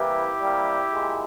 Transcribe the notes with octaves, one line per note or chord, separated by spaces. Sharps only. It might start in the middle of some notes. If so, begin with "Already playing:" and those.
Already playing: C3 E3 G3 A#3 E4 G4
C3 G3 A#3
A#2 G#3